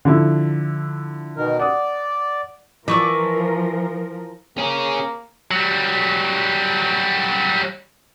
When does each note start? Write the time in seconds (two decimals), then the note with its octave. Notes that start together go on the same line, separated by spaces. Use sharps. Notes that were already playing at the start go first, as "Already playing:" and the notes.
0.05 D3 F3 E4
1.37 B2 D#3 A#4
1.59 D5 F#5 D#6
2.88 E3 F3 A#4 D5 C#6 E6
4.58 A#3 C#4 G#4
5.51 F#3 G3